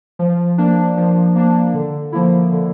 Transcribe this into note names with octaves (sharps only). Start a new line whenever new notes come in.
F3
A#3 D4
F3
A#3 D4
D3
F3 A#3 E4
D3